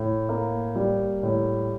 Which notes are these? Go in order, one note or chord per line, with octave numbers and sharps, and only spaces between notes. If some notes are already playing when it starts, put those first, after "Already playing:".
Already playing: A2
A#3
G3
A2